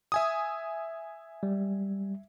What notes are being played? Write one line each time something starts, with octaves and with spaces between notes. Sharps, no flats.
E5 G#5 D#6
G3